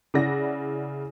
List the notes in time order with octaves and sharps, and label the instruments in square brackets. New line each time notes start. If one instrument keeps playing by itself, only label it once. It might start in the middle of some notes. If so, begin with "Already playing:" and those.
[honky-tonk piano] C#3 E4 D5 F#5 A#6